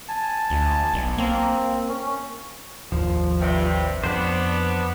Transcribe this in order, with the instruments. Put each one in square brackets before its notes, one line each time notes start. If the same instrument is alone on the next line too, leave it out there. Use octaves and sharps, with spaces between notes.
[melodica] G#5 A5
[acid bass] D2
B1
[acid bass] A#3 [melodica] C4
[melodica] C#4
[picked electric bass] G#1 D#2 [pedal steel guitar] F3
[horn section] G2 C3
[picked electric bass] F2 [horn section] B3 D4 [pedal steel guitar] C5 D5